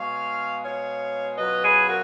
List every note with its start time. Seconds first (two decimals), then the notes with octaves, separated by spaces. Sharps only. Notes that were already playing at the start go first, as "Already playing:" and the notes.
Already playing: B2 G#3 B3 C#5 F5
0.62 C#5 F5
1.37 B2 F#3 C#4 F4 B4 D#5
1.63 G#4 B4
1.87 F#4 A#4